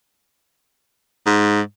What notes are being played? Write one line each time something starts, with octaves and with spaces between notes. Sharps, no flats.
G#2